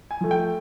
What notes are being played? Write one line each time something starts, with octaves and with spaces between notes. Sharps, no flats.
G#5
F3 A3
G5